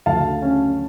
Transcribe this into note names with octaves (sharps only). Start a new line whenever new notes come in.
D2 F5 A5
C#4